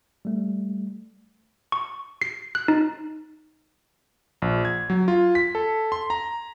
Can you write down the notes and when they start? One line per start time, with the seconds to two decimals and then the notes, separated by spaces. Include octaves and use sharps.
0.25 G3 A3
1.72 C#6
2.22 C7
2.55 F#6
2.68 D#4
4.42 A#1
4.65 G#6
4.90 F#3
5.08 F4
5.35 B6
5.55 A4
5.92 C6
6.10 A#5